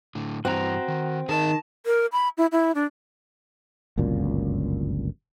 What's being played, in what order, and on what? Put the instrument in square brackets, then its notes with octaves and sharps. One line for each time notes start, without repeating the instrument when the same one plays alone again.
[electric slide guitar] A2 D3
[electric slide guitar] G2 E3 [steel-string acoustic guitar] C4 [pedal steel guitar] F#4 A#5
[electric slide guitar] D#3
[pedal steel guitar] D#3 [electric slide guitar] G#4 A#4 D#5 [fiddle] A5
[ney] A#4
B5
E4
E4
D4
[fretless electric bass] G1 C#2 F#2 A#2